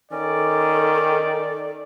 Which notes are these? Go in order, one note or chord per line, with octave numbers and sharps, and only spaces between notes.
D#3 C#4 A4 D5